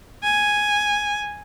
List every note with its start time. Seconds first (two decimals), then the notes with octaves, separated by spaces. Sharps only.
0.24 G#5